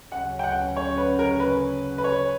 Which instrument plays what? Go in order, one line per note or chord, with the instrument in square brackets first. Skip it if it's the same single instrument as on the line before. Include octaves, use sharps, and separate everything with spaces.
[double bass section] D2 C#3 F#3 C#4 [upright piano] F#5
[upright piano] G5
F#5
C#5
B4
A#4
B4
B4
C#5